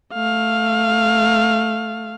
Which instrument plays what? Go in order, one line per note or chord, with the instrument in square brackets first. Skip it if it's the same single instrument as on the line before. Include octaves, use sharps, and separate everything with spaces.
[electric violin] A3 F5